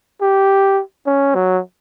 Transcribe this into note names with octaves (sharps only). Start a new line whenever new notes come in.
G4
C#4
F#3